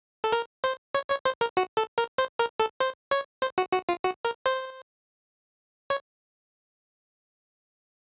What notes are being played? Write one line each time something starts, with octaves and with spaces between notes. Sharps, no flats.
A4
A#4
C5
C#5
C#5
C5
A#4
F#4
A4
A#4
C5
A#4
A4
C5
C#5
C5
F#4
F#4
F4
F#4
A#4
C5
C#5